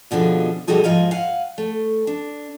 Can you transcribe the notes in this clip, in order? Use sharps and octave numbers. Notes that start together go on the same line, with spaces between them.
D#2 B2 D3 F3 G#4
B2 G3 D#4 F#4 G#4 A4
G#2 F3 D#5 F5 G#5
F5 F#5 G#5
A3
D4